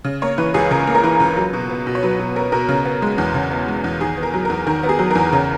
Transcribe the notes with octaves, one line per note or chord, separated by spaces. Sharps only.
C#3
A#3 C#5
E3 B4
C#2 G#4
C#3 A#4
A#3
A#4
E3 B4
C#2
F#3
B2
B3
B2
C#5
F#3 B4
B2
B3 A#4
B2 A#4
C#3
B3
G#3
E2
C#3
B3
G#3
E2
D#3 G#4
B3
A#4
F#3
E2 A#4
D#3 A#4
B3
G#4
F#3
E2 A#4
C#3